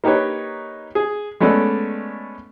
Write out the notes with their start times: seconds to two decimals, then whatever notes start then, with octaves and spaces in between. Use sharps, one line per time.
0.04 A#3 D#4 G4 B4 C#5
0.95 G#4
1.41 G#3 A3 B3 C#4 A4 D5